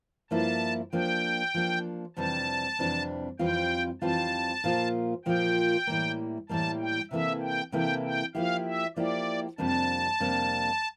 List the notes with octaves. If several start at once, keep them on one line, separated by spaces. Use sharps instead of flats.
G2 F3 A#3 E4 A5
F3 A#3 D4 G5
F3 A#3 D4
F2 C3 E3 G3 D4 A5
F2 C3 E3 G3 D4
F2 E3 G3 C4 F4 G5
F2 E3 G3 C4 F4 A5
A#2 F3 A#3 F4
A#2 F3 A#3 F4 G5
A2 E3 G3 A#3
A2 E3 G3 A#3 A5
G5
C3 E3 A#3 E4 A4 E5
G5
C3 E3 A#3 E4 A4 G5
G5
F3 A#3 E4 G4 F5
E5
F3 A#3 E4 G4 D5
F2 C3 G3 A#3 D4 A5
F2 C3 G3 A#3 D4